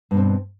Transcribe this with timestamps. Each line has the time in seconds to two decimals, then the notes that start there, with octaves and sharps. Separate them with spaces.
0.11 G2
0.14 B2
0.17 C4